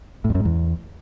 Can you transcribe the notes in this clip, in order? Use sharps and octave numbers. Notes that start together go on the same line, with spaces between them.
A2
F2
F#2
G#2
E2